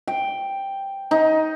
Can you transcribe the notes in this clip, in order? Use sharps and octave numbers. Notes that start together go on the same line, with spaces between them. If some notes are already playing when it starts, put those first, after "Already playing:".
G5
D#4